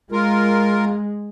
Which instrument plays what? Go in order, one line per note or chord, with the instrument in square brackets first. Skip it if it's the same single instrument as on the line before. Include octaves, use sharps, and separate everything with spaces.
[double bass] G#3 [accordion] F4 A#4